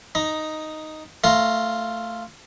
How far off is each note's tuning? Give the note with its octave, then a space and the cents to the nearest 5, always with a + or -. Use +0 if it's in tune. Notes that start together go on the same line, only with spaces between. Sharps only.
D#4 +0 A#5 +10
A3 +15 F4 +0 A#5 -5